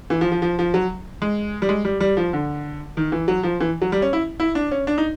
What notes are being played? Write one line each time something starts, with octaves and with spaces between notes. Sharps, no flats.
E3
F3
F3
F3
F3
F#3
G#3
G3
G#3
G3
G3
F3
D3
D#3
E3
F#3
F3
E3
F#3
G3
C#4
E4
E4
D4
C#4
D4
D#4